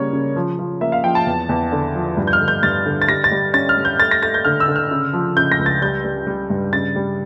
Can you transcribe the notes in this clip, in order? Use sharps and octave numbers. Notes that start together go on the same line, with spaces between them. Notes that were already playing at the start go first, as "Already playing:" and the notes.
Already playing: C#3 G3 A#3 C#5
C#3
F3
F3
A#3 E5
F5
F3 G5
A5
E2
E2
D3
F3
G2
G6
F6
D3
G6
G2 A6
D3
A6
G3 A#6
A6
G3
C#4 A6
F6
G3
G6
A3 A6
A#6
A3 A6
G6
D3 F6
E6
D3
F6
C#3
F3
C#3 G6
A#6
C#2
A6
G3 G6
G3
G3
G2
C#3 A6
G3